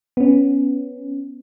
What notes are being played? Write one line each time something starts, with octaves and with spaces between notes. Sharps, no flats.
B3 C#4